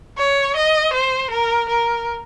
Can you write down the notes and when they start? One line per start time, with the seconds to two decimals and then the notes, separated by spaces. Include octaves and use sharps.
0.18 C#5
0.56 D#5
0.94 C5
1.31 A#4
1.69 A#4